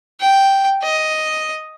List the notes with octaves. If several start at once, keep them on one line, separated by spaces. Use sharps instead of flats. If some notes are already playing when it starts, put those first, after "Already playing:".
G5
D#5